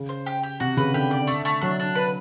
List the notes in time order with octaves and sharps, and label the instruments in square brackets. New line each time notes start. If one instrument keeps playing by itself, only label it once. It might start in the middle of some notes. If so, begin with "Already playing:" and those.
Already playing: [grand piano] C#3
[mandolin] C5
G4
G4
[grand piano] C3 [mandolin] F#4
[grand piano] C#3 [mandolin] B4
[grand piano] D3 [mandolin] G4
[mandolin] D5
A3
A3
[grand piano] F#3 [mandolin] D4
[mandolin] D4
B4